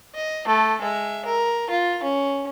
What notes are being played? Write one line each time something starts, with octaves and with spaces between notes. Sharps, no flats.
D#5
A3 A4
G#3 E5
A#4
F4
C#4